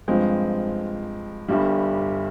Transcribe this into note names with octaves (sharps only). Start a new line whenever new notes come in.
G2 F3 G#3 C4
G1 G2 G3